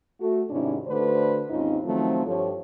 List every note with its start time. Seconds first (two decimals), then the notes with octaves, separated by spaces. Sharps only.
0.20 A3 F#4
0.50 G#2 C3 D#3 C#4 D4 E4
0.87 D3 A3 F#4 B4 C5 D5
1.50 D#2 G#2 C4 C#4 D#4 F4
1.84 D#3 F3 F#3 A3 C4
2.26 G2 F3 G4 A4 C#5